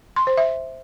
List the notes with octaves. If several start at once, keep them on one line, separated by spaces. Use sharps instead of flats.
C6
C5
E5